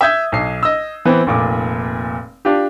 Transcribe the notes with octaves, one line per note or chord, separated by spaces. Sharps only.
E5 D#6 G6 G#6
B1 C7
D#5 E6
E3 B3 C4
F1 A#2 D6
D4 F4 G4